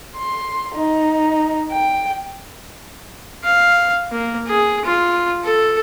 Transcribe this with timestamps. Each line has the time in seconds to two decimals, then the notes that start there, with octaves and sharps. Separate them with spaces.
0.16 C6
0.75 D#4
1.71 G5
3.44 F5
4.12 A#3
4.47 G#4
4.85 F4
5.44 A4